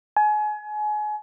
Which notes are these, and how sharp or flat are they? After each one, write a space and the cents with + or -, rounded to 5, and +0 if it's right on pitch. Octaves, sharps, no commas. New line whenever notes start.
G#5 +30